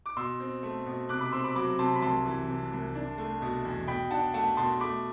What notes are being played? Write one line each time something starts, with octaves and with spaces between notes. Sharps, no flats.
D6
B2 C6 E6
C4
A3
B2
C3 D6 F#6
B5 D6
C4 C6 E6
B5 D6
F#3 B5 D6
C3 A5 C6
B5
C2 A5 C6
E3
C3
C2
D4
A3
B2
E2
B2 G5 B5
D4 F#5 A5
A3 F#5 A5
B2 A5 C6
A3 B5 D6